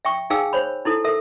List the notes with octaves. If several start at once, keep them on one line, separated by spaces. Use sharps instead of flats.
E5 G5 C#6
D#4 G#4 F5 G5 G#5 E6
C5 C#5 B5
D#4 E4 A4
A4 A#4 E5